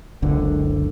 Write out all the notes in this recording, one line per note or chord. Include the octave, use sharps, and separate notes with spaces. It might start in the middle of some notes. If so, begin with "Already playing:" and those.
F#1 C#2 D3